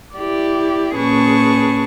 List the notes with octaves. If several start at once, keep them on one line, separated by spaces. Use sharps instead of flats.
E4 G4 D5
A#2 C#4 G#4 B4 A5 C#6